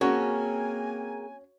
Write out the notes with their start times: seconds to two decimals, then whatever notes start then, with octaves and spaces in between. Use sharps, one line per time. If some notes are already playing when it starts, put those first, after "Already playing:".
0.01 A#3 C4 C#4 F#4 G#4 A#4 G#5